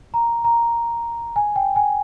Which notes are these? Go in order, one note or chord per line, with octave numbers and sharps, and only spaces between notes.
A#5
A#5
G#5
G5
G#5